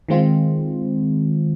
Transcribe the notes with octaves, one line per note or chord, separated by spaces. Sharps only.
D#3 G#3 C4 F4